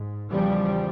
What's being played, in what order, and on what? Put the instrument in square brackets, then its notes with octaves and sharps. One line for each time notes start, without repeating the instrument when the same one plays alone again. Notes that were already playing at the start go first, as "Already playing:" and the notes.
Already playing: [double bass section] G#2
E2 C#3 F3 G3